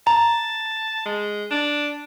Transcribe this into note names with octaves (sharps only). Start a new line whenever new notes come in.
A5 A#5
G#3
D4